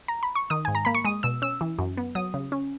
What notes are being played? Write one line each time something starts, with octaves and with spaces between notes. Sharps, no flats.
A#5
B5
C#6
D#3 D#6
G#2 G#5
A#5
A#3 B5
C#6
G#3 D#6
B2 E6
C#4 E6
E3
F#2
B3
F#3 D#6
C#3
C#4